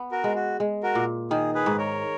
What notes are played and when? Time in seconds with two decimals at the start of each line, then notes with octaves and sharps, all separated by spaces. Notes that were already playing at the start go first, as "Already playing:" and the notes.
Already playing: B3
0.11 F#4 A#4
0.24 G#3
0.35 F#4
0.60 G#3
0.83 F#4 A#4
0.95 A#2
1.31 D#3 G#4
1.54 G#4 B4
1.66 G#2
1.78 A#4 C#5